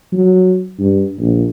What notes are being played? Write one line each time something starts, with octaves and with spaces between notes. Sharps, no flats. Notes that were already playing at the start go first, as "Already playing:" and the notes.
F#3
G2
A#1